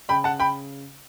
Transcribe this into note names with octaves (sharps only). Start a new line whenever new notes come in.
C#3 G5 B5
F#5 A5
G5 B5